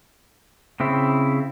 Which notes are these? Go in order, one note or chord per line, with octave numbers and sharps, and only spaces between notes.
C#3 C4 E4